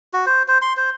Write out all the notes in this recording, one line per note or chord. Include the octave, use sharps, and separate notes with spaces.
F#4
C5
C5
C6
C5